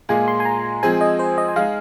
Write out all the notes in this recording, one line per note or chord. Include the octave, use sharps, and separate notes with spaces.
A#2 G#3 F4 G#4 G#5
C6
G#5
A#5
F3 G#3 C4 G#4 G#5
D#5
C5
D#5
G#5
G#3 D#4 G#4 F5